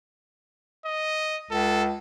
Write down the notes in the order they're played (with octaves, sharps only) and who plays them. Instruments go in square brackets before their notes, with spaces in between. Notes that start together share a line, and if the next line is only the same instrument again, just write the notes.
[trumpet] D#5
[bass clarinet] C#2 [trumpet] A4